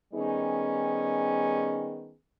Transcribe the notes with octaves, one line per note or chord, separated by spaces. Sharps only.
D#3 G3 B3 C#4 D#4 G#4